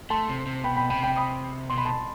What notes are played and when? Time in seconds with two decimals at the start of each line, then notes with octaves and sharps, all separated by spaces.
0.10 A3 A5 C6
0.29 C3
0.46 C3
0.64 B2 G5 B5
0.77 G5 B5
0.90 C3 G5 B5
1.03 G5 B5
1.16 B5 D#6
1.70 B2 C6
1.78 B5
1.85 A5 C6